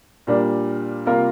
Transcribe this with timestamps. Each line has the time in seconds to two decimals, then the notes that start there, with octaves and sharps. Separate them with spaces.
0.27 A#2 G3 D4 A#4
1.06 C3 G3 A#3 F4 A#4